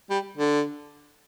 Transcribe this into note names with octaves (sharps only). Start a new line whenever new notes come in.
G3
D3